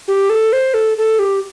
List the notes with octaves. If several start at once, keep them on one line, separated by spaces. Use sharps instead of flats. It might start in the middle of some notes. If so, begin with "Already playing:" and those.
G4
A4
C5
A4
A4
G4